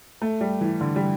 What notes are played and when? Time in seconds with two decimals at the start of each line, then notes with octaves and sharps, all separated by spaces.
0.22 A3
0.41 G3
0.61 E3
0.81 D3
0.96 G3